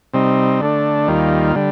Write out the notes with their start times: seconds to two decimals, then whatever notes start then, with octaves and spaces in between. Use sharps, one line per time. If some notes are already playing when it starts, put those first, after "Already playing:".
0.13 C3 G3 C4 D#4
0.61 D3 A3 D4
1.08 D#2 D#3 G3 A#3 F4
1.56 D3 G3